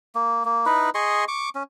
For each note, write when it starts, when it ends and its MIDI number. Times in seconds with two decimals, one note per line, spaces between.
0.15 0.43 58
0.45 0.65 58
0.66 0.90 63
0.66 0.90 64
0.66 0.90 71
0.95 1.25 68
0.95 1.25 75
0.95 1.25 84
0.95 1.25 85
1.28 1.49 85
1.28 1.49 86
1.55 1.63 61